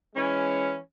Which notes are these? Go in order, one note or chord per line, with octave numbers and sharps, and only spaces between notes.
E3 G#3 C#4